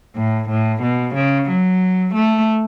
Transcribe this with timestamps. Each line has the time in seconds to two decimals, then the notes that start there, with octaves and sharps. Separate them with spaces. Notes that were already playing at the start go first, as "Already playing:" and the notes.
0.16 A2
0.49 A2
0.82 B2
1.15 C#3
1.49 F#3
2.14 A3